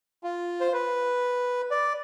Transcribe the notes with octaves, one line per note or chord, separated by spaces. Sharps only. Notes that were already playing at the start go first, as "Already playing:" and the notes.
F4
C5
B4
D5